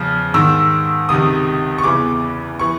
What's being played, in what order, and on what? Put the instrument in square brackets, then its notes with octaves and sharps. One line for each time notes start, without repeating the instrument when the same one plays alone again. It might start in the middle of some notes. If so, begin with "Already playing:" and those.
Already playing: [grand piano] E2 C#3 F3 F6
G#2 D#3 E6
C#2 C3 D#3 D#6
C#6
E2 C#3 E3 D6
E3 C#6